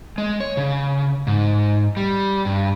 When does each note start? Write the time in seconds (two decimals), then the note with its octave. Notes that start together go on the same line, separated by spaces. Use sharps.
0.18 G#3
0.40 C#5
0.57 C#3
1.27 G#2
1.97 G3
2.45 G2